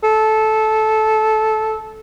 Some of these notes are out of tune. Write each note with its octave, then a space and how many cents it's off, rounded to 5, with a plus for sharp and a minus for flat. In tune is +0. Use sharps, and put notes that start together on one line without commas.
A4 -15